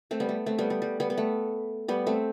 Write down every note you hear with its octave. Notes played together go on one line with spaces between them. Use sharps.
A3 C4
G3 B3
A3
A3 C4
G3 B3
G3
G3
G3 B3
B3
A3
G3 B3
A3 C4